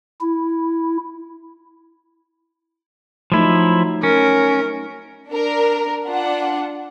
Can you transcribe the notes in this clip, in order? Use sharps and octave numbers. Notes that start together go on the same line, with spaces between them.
E4
F3 F#3 A3 D#4 E4
C#4 A#4
D4 A#4
D4 F4 F#5